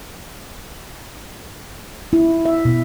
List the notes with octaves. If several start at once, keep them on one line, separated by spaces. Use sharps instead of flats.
E4
E5
B2